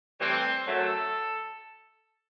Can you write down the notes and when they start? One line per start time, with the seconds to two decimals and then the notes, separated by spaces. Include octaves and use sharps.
0.18 A2 E3 G3 C4
0.66 F#2 F#3 A3 A4